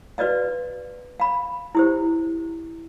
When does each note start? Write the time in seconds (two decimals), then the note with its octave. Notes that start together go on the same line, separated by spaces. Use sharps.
0.18 F#4 B4 D5 D#5 F5
1.20 F5 B5
1.75 E4 G4 C5